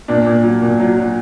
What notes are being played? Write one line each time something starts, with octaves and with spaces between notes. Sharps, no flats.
A#2 D4
A#2
F#3
A#2
F#3
F#3